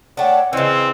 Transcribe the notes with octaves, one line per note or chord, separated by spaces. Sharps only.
A3 D4 C#5 F#5 G5
C#3 E3 C4 D#5